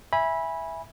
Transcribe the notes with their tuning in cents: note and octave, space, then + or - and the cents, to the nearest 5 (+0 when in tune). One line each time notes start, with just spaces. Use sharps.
E5 +0 G#5 -15 B5 -20